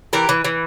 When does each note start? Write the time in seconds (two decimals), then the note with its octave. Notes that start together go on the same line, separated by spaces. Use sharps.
0.13 E3 G4 A#4
0.29 E3
0.44 E3